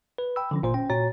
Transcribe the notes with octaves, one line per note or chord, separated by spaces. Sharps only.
B4
G5 B5 E6
D3 F3 C#4
G1 A#2 C5 C6
C#4 G5
A#2 F#4 C#5 A#5 A6